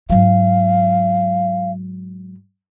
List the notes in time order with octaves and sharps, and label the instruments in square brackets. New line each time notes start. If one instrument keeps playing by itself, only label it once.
[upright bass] G#2 F#3 [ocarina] F5